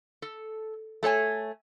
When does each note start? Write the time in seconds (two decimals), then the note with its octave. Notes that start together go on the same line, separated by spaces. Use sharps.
0.22 A4
1.03 A3 A4 C#5 G#5